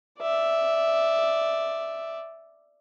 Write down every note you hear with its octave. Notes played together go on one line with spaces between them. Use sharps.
D5 E5